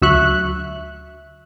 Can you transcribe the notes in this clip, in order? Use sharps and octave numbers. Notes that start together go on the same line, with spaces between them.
D2 F#3 E5 C#6 F#6